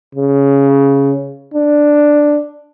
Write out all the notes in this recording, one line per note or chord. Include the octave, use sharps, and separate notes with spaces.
C#3
D4